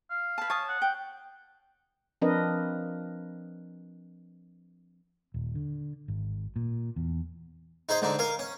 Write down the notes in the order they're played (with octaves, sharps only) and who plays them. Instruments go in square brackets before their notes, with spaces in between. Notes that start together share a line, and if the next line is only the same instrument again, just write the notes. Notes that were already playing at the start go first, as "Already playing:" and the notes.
[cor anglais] F5
[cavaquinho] B4 A5
C#5 A5 D#6
[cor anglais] F#5
[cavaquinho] G5
[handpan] F3 C4 D4 A#4 B4 D#5
[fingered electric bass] D#1
D3
G#1
A#2
E2
[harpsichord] D#4 G#4 C5 D#5
G#2 D3 D#4
A#4 F5 G#5
C#4